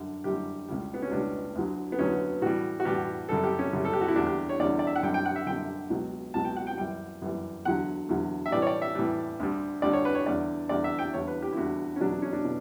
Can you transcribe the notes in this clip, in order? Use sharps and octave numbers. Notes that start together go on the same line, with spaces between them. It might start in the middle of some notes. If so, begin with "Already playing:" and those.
Already playing: F#2 D3 G3
F#2 D3 G3 G4
C#2 C#3 G3
B3
C#4
C#2 C#3 G3 D4
D2 D3 F#3
B3
D2 D3 F#3 C#4
A2 E3 G3 F#4
F#4
A2 E3 G3 G4
F#2 C#3 G3 A4
G4
C#4
F#2 C#3 G3
A4
G4
F#4
E4
E2 D3 G3 D4
G4
C#5
E2 D3 G3 D5
D5
E5
F#5
F#2 D3 G3 G5
G5
F#5
E5
F#2 D3 G3 G5
C#2 B2 F#3
C#2 B2 F#3 A5
G5
F#5
G5
F#2 E3 G3 G5
F#2 E3 G3
E2 D3 F#3 F#5
E2 D3 F#3
E5
A2 E3 G3 D5
C#5
D5
E5
A2 E3 G3
D2 D3 G3
D2 D3 G3 D5
C#5
B4
C#5
E2 D3 G3 D5
E2 D3 G3 D5
E5
G5
E2 D3 G3 C#5
B4
G4
E4
E2 D3 G3 F#4
C#4
E2 B2 F#3 D4
D4
C#4
D4
B2